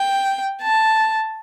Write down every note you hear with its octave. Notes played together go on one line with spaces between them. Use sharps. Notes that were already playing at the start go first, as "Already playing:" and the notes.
Already playing: G5
A5